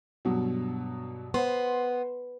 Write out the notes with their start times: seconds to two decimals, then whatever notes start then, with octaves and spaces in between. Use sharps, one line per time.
0.25 G2 B2 F#3
1.34 B3 C5 F#5 C6